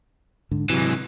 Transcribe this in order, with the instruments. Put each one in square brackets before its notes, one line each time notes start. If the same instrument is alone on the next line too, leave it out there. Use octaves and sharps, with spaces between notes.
[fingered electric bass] G#2 D3
[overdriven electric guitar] G#2 E3 [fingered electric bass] C3 F#3